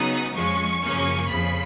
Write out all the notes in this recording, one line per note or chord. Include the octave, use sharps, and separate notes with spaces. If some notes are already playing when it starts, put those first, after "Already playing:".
Already playing: C#3 F#3 B3 D#4 D#6
F2 F3 G#3 C#4 C#6
F#2 C#3 F3 A#3 C#4
F2 C#3 F3 B5